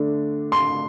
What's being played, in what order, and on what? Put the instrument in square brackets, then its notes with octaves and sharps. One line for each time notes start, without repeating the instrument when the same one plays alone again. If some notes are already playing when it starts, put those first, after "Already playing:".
Already playing: [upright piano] D3 A3 D4
C6